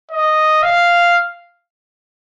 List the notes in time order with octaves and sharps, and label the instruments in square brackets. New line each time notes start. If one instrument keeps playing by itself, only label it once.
[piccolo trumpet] D#5
F5